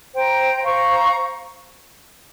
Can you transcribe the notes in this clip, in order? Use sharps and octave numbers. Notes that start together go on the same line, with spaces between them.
C5 G5 A#5
C5 F5 A#5 C#6